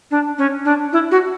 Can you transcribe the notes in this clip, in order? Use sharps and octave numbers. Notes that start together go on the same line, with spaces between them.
D4
C#4
D4
E4
F#4